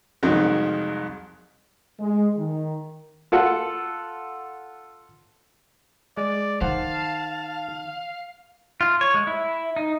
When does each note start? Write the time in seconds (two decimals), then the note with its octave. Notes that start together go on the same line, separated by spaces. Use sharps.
0.23 C2 F2 D#3 F#3 G#3
2.00 G#3
2.37 D#3
3.32 F4 A4 F#5
6.17 G#3 D5
6.61 D#3 C5 F5 F#5 A5
8.81 F4
9.01 C#5
9.14 G#3
9.27 E4
9.76 D#4